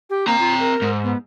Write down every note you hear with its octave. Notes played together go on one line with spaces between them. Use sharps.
G4
A#3 C4 A#5
F4
A#4
G#2
B3